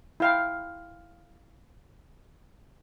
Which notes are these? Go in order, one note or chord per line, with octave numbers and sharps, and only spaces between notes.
E4 F5 G5